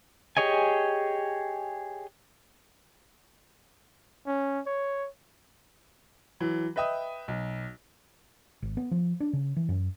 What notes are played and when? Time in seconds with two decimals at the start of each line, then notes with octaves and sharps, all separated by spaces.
0.37 G4 G#4 C#5 D#5 G#5
4.26 C#4
4.66 C#5
6.40 E3 F#3
6.76 B4 D#5 E5 G5 D#6
7.28 B1
8.62 G#1
8.77 B3
8.91 F3
9.20 D4
9.33 C#3
9.57 E3
9.69 F#2